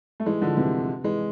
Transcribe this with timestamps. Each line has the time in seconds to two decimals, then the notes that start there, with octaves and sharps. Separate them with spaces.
0.20 A3
0.26 E3 G#3
0.41 D3 F3
0.57 C3 E3
1.04 E3 G#3